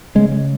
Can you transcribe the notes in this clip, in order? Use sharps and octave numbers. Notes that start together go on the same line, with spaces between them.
C#3 G#3